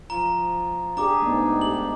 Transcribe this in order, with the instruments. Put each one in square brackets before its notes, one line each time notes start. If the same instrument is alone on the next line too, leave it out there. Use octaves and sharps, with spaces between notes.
[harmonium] F3 F4 [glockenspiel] A#5
[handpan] D4 G4 G#4 [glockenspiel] A#5 D6
[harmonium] G#2 D4 D#4 [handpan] A3 B3
[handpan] G4 [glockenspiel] F#7